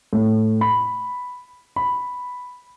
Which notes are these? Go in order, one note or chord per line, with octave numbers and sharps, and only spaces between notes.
A2
B5
B5